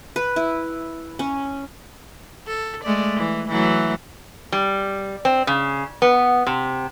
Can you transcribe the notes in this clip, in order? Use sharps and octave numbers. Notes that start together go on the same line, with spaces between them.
B4
E4
C#4
A4
G#3 A3 D5
E3
E3 F#3 A3
G3
C4
C#3
B3
C3